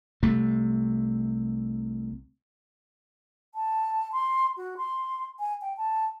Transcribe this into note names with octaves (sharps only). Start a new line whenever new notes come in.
C2 C3 A3
A5
C6
F#4
C6
G#5
G5
A5